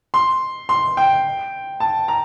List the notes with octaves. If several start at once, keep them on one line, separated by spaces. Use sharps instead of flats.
C6
C6
G5
A5
A#5